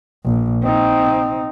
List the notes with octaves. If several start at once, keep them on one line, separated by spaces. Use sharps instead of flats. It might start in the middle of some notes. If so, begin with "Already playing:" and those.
A#1
C4 D#4